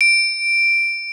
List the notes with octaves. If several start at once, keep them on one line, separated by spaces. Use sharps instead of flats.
D7